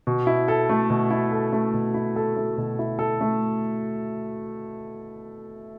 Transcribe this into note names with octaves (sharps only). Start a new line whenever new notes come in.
B2
E4
A4
A3
B2
E4
A4
A3
B2
E4
A4
A3
B2
E4
A4
A3